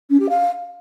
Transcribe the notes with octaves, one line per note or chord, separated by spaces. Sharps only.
C#4
G4
F5